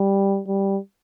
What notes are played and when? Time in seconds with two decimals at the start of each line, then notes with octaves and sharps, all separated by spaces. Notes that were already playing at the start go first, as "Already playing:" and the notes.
Already playing: G3
0.47 G3